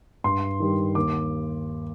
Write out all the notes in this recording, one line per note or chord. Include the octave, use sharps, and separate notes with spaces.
G2 C6
D#3 G3
D#2 D6